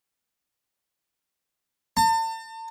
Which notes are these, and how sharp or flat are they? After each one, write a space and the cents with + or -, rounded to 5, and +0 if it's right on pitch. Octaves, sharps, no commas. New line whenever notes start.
A5 +40